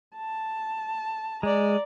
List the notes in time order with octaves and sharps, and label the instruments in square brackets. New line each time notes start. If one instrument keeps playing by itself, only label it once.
[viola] A5
[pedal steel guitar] G#3 [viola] D5 A#5